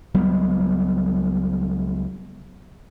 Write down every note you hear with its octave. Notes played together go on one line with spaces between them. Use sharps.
C#2 F#3 G3 B3